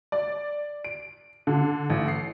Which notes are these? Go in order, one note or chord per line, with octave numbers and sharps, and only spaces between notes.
D5
D7
D3
A1
C7